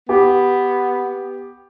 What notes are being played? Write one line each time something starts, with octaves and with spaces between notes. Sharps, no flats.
B3 G4